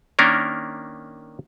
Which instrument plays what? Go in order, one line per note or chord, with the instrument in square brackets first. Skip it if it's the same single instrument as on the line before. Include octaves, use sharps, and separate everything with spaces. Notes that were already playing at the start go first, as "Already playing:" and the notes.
[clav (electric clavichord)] D#3 A#3 C#4 D4 A#4